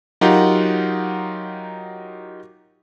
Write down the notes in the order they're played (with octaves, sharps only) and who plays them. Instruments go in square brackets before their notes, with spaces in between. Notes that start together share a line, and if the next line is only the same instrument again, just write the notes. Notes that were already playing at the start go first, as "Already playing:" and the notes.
[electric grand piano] F#3 D#4 F4 G4 A#4 F#5